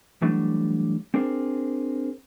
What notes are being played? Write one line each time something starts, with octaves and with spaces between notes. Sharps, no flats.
E3 F#3 G3 A3 D4
C4 D4 G#4 A#4 C5